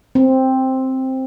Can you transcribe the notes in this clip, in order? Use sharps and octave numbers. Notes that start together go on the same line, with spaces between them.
C4